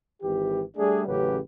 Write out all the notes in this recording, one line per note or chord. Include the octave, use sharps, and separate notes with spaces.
G#1 E3 G4
G3 A3 D4 G#4
A1 C#3 F#3 G4 B4